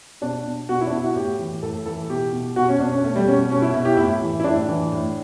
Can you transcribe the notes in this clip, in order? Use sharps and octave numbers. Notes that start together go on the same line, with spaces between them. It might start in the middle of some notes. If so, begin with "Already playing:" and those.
B2 D4
B2
B2 F#4
E4
D4
B2 E4
F#4
A2 G4
E3
A2 A4
E3 A4
B2 G4
B2
B2 F#4
C#4
B2 D4
C#4
B2 A3
G3
B2 C#4
B2 C#4
E4
B2 E4
G4
A2 E4
E3
E4
A2 D4
E3
A2